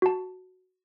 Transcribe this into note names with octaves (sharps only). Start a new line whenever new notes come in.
F#4 A5